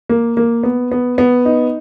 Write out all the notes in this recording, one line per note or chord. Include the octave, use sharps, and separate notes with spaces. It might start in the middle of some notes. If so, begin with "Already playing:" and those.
A#3
A#3
B3
B3
B3
D#4